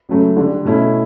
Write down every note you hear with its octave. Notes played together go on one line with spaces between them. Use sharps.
C#2 C#3 F#3 A3
D3 G3 D4
B2 A3 C#4 E4